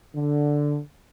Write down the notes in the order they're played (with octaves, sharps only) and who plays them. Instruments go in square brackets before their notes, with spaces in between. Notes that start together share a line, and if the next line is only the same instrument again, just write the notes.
[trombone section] D3